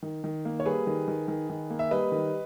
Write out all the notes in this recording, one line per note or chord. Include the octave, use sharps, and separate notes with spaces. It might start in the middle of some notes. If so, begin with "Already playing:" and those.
D#3
D#3
A#3
C#5
G3 G#4 B4
D#3
D#3
D#3
D#3
A#3
E5
G3 B4 D#5
D#3